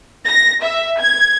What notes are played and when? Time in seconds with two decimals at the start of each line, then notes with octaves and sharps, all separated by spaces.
0.25 A#6
0.63 E5
0.98 G#6